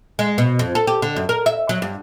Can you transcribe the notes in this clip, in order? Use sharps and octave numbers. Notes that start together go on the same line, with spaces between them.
G#3
B2
F2
A4
G4
D3
F#2
A#4
E5
F#3
G2